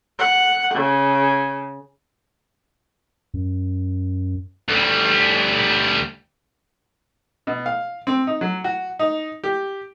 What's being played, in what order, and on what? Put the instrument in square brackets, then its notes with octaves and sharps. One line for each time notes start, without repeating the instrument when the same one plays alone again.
[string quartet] F#5
C#3
[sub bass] F#2
[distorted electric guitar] D2 G3
[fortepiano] B2
F5
C4
D#4
F#3
F#4
D#4
G4